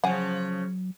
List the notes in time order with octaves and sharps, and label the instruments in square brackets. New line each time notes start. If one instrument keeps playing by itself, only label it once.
[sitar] C#3 F3 [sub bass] F#3 [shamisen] G#4 F#5